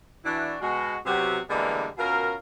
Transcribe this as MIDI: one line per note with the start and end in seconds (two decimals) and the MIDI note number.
0.25 0.56 52
0.25 0.56 62
0.25 0.56 66
0.62 0.97 47
0.62 0.97 56
0.62 0.97 66
1.05 1.40 48
1.05 1.40 54
1.05 1.40 59
1.05 1.40 66
1.05 1.40 67
1.49 1.87 50
1.49 1.87 52
1.49 1.87 55
1.49 1.87 56
1.49 1.87 58
1.49 1.87 59
1.98 2.34 47
1.98 2.34 61
1.98 2.34 65
1.98 2.34 70